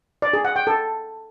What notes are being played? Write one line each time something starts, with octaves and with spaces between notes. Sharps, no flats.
D5
G#4
F#5
G5
A4